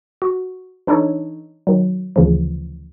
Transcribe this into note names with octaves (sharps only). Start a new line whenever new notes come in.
F#4
E3 D4 D#4 A4 C#5
D#3 F#3
D2 C#3 E3 F3